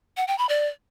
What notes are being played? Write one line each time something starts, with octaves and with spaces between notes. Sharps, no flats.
F#5
G5
B5
D5